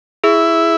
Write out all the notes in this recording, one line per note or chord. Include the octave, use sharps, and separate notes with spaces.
E4 G#4